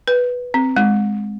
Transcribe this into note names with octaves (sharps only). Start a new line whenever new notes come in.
B4
C4
G#3